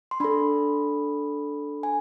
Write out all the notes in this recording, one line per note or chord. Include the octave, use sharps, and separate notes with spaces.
C6
D4 A4 B5
G#5